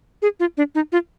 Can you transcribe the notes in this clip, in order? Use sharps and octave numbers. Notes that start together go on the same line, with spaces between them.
G#4
F4
D4
D#4
F4